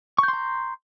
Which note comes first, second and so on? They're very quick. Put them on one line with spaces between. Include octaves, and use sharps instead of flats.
C#6 G6 C6 A#5